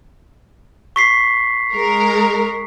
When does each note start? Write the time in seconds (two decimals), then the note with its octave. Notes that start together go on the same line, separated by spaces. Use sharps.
0.96 C#6 B6 C7
1.75 G#3 A#4